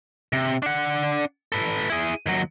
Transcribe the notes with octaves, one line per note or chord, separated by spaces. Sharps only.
C3
D4 F#5
A4 B4
E4 G#4
D#2 F#3